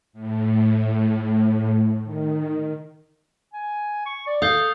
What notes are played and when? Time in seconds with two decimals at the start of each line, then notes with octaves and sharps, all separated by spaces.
0.13 A2
2.04 D#3
3.53 G#5
4.05 C#6
4.27 D5
4.42 A4 F5 D#6 G6 G7